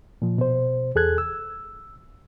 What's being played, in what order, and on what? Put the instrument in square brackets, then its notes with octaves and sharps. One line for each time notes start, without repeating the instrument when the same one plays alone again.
[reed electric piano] A#2 F3
B2 C5
E2 G#4 A4 F#6 G#6
E6